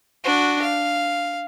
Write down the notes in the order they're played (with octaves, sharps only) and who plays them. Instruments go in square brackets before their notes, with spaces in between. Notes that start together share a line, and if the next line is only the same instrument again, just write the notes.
[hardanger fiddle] D4 F#4
F5